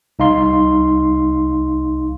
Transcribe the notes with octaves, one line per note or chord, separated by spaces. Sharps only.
C2 D#4 F5 C6